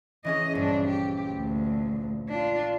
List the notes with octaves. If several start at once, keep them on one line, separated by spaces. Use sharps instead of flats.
E3 C#4 G#4 D#5
A#1 G2 D4
G4
D2
D4 F4